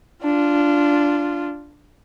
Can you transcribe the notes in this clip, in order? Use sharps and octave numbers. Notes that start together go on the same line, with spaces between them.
D4 F4